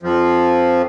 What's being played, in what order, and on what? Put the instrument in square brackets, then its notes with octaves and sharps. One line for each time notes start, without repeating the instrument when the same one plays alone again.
[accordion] F2 F3